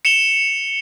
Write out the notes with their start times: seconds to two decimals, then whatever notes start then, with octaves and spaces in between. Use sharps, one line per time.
0.05 C#7 E7 F7 G7